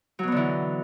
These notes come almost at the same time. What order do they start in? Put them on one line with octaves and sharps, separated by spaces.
F#3 B2 B3 D3 E3